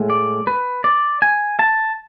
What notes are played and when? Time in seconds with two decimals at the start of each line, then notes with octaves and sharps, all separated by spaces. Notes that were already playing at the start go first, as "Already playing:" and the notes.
Already playing: A2 G#3
0.10 D5
0.47 B4
0.84 D5
1.22 G#5
1.59 A5